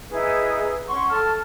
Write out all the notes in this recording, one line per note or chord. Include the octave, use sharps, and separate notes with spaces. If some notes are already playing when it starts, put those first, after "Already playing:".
D#4 E4 G#4 B4
C#4 F#5 C6 C#6
A4 A5 F6